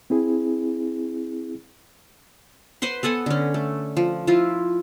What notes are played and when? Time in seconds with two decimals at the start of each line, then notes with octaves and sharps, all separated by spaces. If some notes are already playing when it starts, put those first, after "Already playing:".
0.10 C4 E4 G#4
2.82 B4 C5 F#5 C6
3.03 B3 A4 F#5 G#5
3.26 D3 C#4
3.54 A3
3.97 F3
4.27 F3 E4 F4